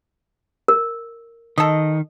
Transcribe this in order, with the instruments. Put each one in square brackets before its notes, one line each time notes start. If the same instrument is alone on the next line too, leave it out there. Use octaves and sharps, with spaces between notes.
[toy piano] A#4
[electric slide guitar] D#3 [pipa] A4 D#5